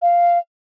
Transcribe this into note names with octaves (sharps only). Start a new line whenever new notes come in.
F5